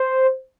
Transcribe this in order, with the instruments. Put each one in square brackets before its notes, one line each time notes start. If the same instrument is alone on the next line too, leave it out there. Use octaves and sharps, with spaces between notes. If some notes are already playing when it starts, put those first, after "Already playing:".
Already playing: [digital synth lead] C5